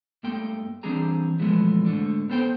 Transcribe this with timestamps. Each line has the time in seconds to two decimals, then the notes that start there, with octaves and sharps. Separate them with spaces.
0.23 G2 A3 A#3 G5 C6
0.83 E3 G3 C4 D4 G#4 A#5
1.39 B2 E3 F3 G#3 A3 B3
1.85 G#2 D3 A3 D4
2.30 B3 A4 C5 G5